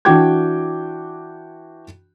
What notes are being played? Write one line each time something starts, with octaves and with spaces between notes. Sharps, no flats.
E3 D4 F#4 G5 D6 G#6